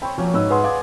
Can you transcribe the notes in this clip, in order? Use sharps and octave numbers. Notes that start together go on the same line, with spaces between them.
C4 C#5 B5
F3 F#3 A#3 C#4
G#2 B4 C#5 E6
G#4 B4 F#5 C6
D5 F5 G#5 D#6